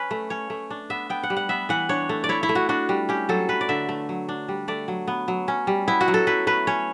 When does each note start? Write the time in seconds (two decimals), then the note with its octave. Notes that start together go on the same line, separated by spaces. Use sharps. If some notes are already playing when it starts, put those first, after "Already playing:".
Already playing: C#4 B4
0.11 A3
0.30 C#4 C#5
0.50 A3
0.70 D4
0.90 B3 E5
1.10 B3 G5
1.23 F#5
1.30 G3
1.37 F#5
1.49 B3 E5
1.69 E3 F#5
1.89 D4 C#5
2.09 A3
2.24 D5
2.29 E4 C#5
2.43 E4
2.49 A3
2.55 F#4
2.69 D4 F#4
2.89 G3
3.09 C#4 G4
3.29 F#3 A4
3.49 A3 B4
3.61 D5
3.69 D3 E5
3.89 A3
4.09 F#3
4.29 D4
4.48 G3
4.68 A3 D5
4.88 F#3
5.08 B3
5.28 F#3
5.48 C#4
5.67 G3
5.88 B3 E4
6.01 F#4
6.08 F#3
6.14 A4
6.27 E4 B4
6.47 A3 B4
6.67 C#4 C#5